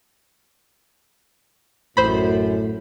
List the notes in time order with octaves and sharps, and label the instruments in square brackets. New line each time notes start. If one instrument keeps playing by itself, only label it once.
[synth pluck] A1 C5 B5 [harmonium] F#2 [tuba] A2